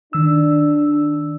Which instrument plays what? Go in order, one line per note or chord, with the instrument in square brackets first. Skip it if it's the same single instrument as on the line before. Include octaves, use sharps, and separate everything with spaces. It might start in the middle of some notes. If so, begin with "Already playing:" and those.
[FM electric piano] D#3 E6 [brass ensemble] D4